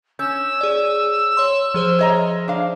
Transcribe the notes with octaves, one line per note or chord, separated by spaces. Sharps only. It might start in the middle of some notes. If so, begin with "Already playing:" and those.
C#4 E6 G6
G#4 D5
C#5 C6
F3 G#4 C5
C#5 D#5 A#5
D4 F5